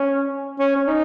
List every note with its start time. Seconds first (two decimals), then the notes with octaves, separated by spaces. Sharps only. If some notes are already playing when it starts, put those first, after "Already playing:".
Already playing: C#4
0.59 C#4
0.76 C#4
0.88 D#4